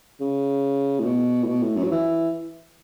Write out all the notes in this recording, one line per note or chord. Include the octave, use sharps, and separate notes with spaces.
C#3
A2
B2
A2
B2
A2
F#2
F#3
E3